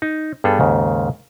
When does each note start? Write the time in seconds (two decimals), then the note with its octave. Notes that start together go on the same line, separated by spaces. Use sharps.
0.02 D#4
0.44 G2 G3 B3 G#4 A4
0.60 D#2 G#2 C#3